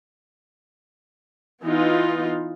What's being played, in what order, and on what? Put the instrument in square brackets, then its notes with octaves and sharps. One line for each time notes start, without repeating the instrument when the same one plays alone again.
[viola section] E3 B3 D#4 F4